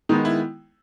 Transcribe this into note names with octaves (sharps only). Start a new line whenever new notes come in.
D#3 G#3 B3 D#4
E4